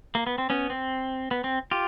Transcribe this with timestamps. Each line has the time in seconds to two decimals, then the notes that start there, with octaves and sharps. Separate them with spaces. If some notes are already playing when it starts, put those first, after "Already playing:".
0.15 A#3
0.27 B3
0.38 C4
0.50 B3 C#4
0.70 C4
1.31 B3
1.44 C4
1.71 F4 G4